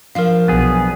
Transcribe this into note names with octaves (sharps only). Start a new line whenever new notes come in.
F3 D4 A#4 F5
B1 B3 G#4